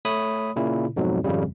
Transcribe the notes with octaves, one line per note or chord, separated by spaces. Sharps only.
A3 C#5 B5 D#6
A#2 C#3 E4
F2 G#2 B2 F#3
G#1 F2 C#3 G3